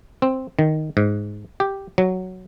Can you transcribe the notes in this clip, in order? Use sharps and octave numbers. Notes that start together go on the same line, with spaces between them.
C4
D#3
G#2
G4
F#3